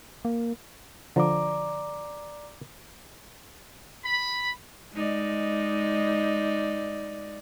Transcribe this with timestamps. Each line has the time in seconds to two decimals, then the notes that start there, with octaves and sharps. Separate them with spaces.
0.25 A#3
1.16 D3 F3 D5 A#5 D6
4.05 B5
4.93 G#3 D#4 D5